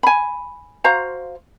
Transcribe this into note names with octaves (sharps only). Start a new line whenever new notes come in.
G#5 B5
F#4 C5 F5 A#5